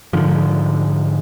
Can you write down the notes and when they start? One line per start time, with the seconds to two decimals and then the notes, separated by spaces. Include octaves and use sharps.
0.13 G#2 D3 F3